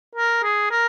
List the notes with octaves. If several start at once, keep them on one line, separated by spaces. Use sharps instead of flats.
A#4
G#4
A#4